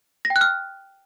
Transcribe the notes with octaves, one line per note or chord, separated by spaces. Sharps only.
A#6
G5
F#6
F6